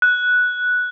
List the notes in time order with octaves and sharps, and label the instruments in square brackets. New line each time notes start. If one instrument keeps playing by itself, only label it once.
[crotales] F#6